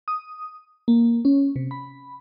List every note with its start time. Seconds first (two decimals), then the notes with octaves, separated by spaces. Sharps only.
0.08 D#6
0.88 A#3
1.25 C#4
1.56 C3
1.71 B5